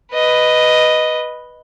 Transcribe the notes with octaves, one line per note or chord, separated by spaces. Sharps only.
B4 D#5